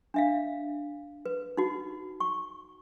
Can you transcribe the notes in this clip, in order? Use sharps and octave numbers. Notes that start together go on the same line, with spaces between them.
D4 E5 F5
B4
D#4 F#4
C#6